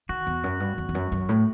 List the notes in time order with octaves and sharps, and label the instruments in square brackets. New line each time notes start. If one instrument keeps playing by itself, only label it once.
[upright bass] D#3 [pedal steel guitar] F#4
[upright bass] E2
F#2
G2
E2
E2
F#2
F#2
A2